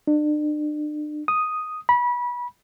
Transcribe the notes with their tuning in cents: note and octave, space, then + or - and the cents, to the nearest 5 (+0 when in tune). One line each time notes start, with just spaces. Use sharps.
D4 +40
D#6 +0
B5 -25